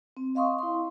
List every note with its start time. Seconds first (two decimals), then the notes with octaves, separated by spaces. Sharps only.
0.17 C4
0.35 D#5 F5 C6 C#6 D#6
0.59 E4 C6